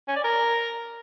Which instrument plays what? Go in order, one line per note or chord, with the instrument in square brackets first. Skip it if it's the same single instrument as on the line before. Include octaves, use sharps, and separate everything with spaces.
[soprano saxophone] C#4
D5
A#4